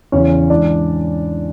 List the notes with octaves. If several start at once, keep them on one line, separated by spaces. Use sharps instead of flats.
E2 C#3 E3 C#4 C#5
G#2 E3 D4 D5